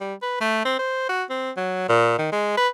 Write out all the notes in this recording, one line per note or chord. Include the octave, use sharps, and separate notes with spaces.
G3
B4
A3
C4
C5
F#4
C4
F#3
A#2
D#3
G#3
B4